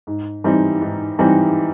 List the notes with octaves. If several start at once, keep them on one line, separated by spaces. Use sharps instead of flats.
G#2
E3 G3 C4 D#4
G#2
E3 G3 C4 D#4